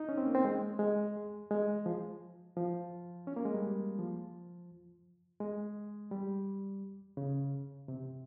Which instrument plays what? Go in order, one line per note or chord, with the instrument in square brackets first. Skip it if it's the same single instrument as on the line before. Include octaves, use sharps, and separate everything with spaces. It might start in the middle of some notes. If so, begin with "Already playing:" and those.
Already playing: [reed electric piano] D#4
C#4
C4
A#3
C4
G#3
G#3
G#3
F3
F3
C#4
A#3
G#3
G3
F3
G#3
G3
C#3
C3